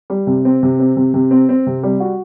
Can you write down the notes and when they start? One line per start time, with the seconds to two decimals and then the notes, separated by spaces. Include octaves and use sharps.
0.10 G3
0.27 C3
0.45 C4
0.63 C3
0.79 C4
0.97 C3
1.14 C3
1.31 C4
1.49 C4
1.67 C3
1.83 G3
2.00 F#4